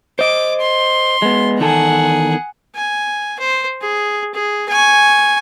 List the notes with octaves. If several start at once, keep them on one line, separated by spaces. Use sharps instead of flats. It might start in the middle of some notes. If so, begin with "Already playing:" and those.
C5 D#5 D6
C6
G#3 B3
E2 D#3 G#4 A4 F#5
G#5
C5
G#4
G#4
G#5 C#6